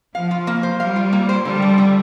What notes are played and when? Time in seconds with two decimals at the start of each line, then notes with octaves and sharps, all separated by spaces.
0.14 F3 F5
0.31 F4
0.47 A#3
0.63 C5
0.80 G3 F5
0.96 F4
1.13 A#3
1.29 C5
1.45 D3 G3
1.62 F3
1.78 D3